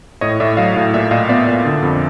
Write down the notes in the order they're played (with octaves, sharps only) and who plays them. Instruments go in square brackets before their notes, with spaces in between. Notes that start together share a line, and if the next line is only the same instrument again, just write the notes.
[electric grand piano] A2 C#5 D#5
A2 D5 E5
F#3 D#5 F5
A2
A#2 D5 E5
A#2 D#5 F5
B3 D5 E5
A#2
D3
F2